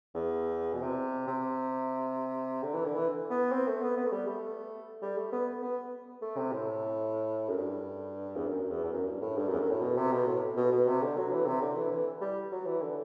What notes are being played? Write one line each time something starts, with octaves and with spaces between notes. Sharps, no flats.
E2
B2
C3
C3
D3
E3
D3
E3
B3
C4
A3
B3
B3
A3
G3
A3
G3
A3
B3
B3
A3
C3
A2
F#2
G2
E2
F#2
E2
E2
F#2
G2
A2
G2
F#2
E2
F#2
A2
B2
C3
B2
A2
B2
B2
C3
D3
F#3
E3
C3
D3
E3
E3
G3
F#3
E3
D3